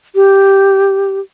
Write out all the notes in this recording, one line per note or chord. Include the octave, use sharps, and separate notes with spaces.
G4